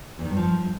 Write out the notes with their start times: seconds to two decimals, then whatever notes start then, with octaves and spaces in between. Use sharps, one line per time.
0.19 E2
0.25 D#3
0.31 G2
0.37 F3